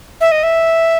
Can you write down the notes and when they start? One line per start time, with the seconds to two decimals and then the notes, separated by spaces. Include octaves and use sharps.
0.21 E5
0.32 D#5
0.43 E5